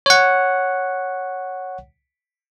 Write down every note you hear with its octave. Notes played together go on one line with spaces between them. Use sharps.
C#5 F#5